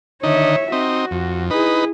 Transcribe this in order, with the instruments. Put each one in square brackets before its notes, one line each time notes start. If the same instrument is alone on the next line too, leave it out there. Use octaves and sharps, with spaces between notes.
[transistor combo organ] D3 D#3 D#4 [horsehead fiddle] C#5 E5
[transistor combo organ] C4 D#4 [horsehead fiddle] F#4
[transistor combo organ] F2
[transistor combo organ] D#4 B4 [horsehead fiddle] E4 G#4